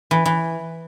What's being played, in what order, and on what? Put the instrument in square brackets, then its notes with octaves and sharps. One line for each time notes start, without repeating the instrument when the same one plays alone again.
[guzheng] E3
E3